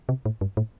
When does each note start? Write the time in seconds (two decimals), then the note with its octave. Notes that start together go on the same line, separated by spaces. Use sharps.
0.09 C3
0.26 A2
0.41 G2
0.57 A2